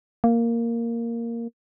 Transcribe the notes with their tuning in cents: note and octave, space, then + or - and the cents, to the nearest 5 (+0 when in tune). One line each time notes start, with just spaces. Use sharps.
A#3 -5